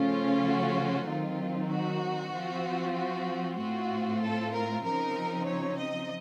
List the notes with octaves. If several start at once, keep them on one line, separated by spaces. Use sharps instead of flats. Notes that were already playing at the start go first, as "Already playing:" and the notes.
Already playing: C#3 F3 A3 C#4 F4
F#4
D#3 F#3 C4 D#4 F4
F#4
F3 C4 F4
F#4
A2 A3 C4 F4 F#4
A4
A#4
C#3 F3 C4 D#4 A#4
C#5
D#5